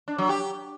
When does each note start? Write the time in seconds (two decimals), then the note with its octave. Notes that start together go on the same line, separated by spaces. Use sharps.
0.08 D4
0.18 F#3
0.29 G4